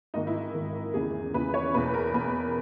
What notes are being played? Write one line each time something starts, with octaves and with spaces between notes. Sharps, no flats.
G#1 G#2 D#3 D#4
E4
G#1 G#2 D#3
E2 C#3 E3 G#4
E2 C#3 E3 B4
C#5
E2 B2 B4
A#4
E2 B2 B4